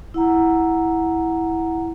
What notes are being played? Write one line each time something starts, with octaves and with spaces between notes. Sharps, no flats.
E4 F#5 A#5